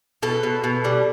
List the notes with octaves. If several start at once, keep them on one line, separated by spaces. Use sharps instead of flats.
B2 A4
B2
B2
G3